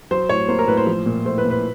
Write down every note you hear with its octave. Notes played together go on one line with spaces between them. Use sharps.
F#3 C5
A2 C#5
A#3 C5
A#4
A2 B4
C5
F3
A#2
A3 C5
B4
A#2
B4